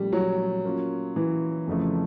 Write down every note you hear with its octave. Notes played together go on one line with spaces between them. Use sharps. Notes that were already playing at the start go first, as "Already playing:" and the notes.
Already playing: A#2 F3 G3 A3 C#4
F#3
A#3 C#4 F4
E3
F2 C#3 F3 A3